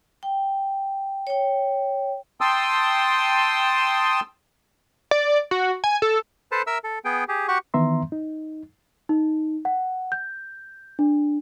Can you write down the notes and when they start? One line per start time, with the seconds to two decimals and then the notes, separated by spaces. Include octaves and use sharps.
0.23 G5
1.27 C#5 G5
2.41 G5 A5 C6 D#6 E6
5.11 D5
5.51 F#4
5.84 G#5
6.02 A4
6.52 A4 B4 C5 A5
6.67 A#4 E5 E6
6.84 A4
7.05 B3 G#4 G5
7.28 G4 G#4
7.48 F#4 G4 F#5 C#6
7.74 D#3 E3 B3 E5 A#5 C6
8.12 D#4
9.09 D#4
9.65 F#5
10.12 G6
10.99 D4